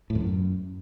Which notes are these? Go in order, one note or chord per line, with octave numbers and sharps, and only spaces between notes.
A2
E2
F#2